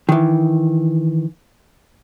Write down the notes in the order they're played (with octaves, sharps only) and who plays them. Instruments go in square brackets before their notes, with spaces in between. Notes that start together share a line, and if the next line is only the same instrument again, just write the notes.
[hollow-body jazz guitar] D#3 E3